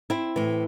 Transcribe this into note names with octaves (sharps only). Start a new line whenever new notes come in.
C4 E4
A2 E3